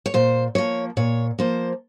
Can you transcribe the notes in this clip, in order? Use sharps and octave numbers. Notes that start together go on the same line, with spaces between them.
C#5
A#2 C5
F3 A#3 C#5
A#2 C#5
F3 A#3 C5